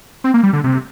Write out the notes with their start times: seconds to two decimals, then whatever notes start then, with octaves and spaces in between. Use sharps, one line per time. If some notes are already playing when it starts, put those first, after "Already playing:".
0.24 C4
0.34 A#3
0.43 G3
0.53 D3
0.64 C3